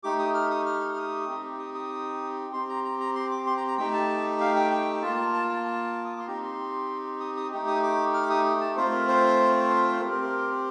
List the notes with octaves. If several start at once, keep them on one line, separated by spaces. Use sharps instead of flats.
A3 D#4 G4 D6
D#6
F6
D#6
F6
F6
D#6
C4 D#4 G4
D#6
D#6
C4 G4 C6
A#5
A#5
A#5
C6
D6
C6
A#5
A#5
A3 D#4 G4 G5
A5
F5
G5
G5
A#3 F4 A5
A5
A5
D#6
D6
C6
C4 D#4 G4 A#5
C6
D#6
D#6
A3 D#4 G4
D#6
D6
F6
D6
D#6
A5
A3 C4 F4 C5
A#4
C5
C5
C4 G4 A#4
A#4
A#4